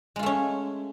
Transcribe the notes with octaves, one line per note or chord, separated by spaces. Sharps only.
G#3 A3 C#4 F4